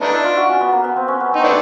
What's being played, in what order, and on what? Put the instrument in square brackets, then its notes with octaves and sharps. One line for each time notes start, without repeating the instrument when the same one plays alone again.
[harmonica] A3 B3 D4 [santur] D#4
[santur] E4
F4
F#4
C#4
B3
A#3
B3
C4
C#4
B3
[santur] C4 [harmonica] D#4
[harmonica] A3 B3 D4